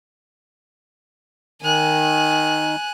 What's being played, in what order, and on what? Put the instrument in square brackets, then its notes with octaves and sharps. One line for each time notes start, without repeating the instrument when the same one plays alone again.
[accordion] D#3 [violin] G#5 F#6